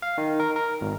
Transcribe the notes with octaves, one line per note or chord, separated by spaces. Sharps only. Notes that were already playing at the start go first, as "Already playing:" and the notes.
F5
D#3
A#4
A#4
G#1